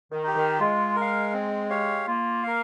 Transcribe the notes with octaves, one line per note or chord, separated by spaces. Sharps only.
D#3
D#4 G4
D#3
G#3 F4
A#4
F5
C4
G4 C#5 F5
A#3 F4
A#4 F5